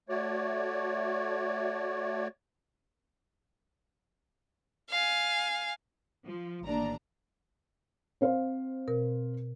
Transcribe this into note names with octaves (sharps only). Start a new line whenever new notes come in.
A3 F#4 C#5 D5
F5 G#5
F3
A1 D#2 A2 D4 A#5
C4 C5 F5
B2 A#4